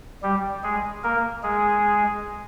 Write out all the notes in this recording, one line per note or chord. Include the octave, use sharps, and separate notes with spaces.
G3 G4
G#3 G#4
A#3 A#4
G#3 G#4